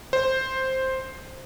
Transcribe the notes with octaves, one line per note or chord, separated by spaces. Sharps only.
C5